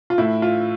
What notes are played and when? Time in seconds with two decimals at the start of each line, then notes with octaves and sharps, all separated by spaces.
0.10 F4
0.18 A2 E4
0.42 F4